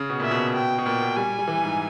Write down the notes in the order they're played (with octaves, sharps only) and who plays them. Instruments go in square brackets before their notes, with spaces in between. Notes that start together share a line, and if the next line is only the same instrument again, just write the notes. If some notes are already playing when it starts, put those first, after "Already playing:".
Already playing: [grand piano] C#3
B2
[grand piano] A#2 [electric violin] E5
[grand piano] B2
[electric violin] G5
[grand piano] B2
[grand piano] A#2 [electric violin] G5
[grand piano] B2
[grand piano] G3 [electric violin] G#5
[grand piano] G3
E3
G#2